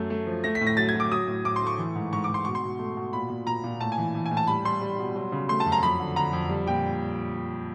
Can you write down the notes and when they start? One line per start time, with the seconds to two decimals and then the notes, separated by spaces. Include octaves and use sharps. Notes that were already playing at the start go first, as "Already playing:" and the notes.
Already playing: F#2 A3
0.10 A3
0.27 F3
0.44 A3 A#6
0.55 B6
0.61 A2
0.67 A#6
0.77 F#3 A6
0.89 G#6
0.94 F#3
1.00 D6
1.12 F#3 D#6
1.27 A2
1.45 A2 D6
1.56 C6
1.62 A3 C#6
1.78 E3
1.95 G#2
2.13 G#2 C#6
2.24 D6
2.29 G#2
2.34 C6
2.45 B2 C#6
2.55 C6
2.63 B2
2.79 A3
2.97 B2
3.13 A#2 B5
3.30 A#2
3.47 A#2 A#5
3.64 A#2
3.81 A2 A5
3.92 G#5
3.98 E3
4.15 E3
4.26 G#5
4.31 A2
4.37 A5
4.47 G3 B5
4.65 G3 C6
4.81 G3
4.99 B2
5.16 F#3
5.32 C#3
5.49 A3 C6
5.60 A5
5.66 F#2
5.72 A#5
5.83 F2 B5
6.00 D3
6.16 D3 A#5
6.33 F2
6.50 G3
6.66 A#2 G5